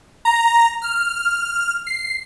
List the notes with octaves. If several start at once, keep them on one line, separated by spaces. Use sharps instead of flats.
A#5
F6
C7